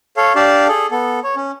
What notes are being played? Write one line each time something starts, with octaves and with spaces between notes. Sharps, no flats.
A4 C#5 F5
D4 G4 D5 F5 A5
G#4 A4
B3 A4
C#5
C#4